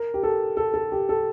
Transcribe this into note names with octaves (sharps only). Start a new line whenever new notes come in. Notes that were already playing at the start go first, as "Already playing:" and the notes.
Already playing: A#4
G4
A4
A4
A4
G4
A4